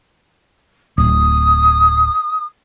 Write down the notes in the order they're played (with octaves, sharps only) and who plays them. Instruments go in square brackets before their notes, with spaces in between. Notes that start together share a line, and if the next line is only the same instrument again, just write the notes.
[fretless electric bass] D1 [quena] D#6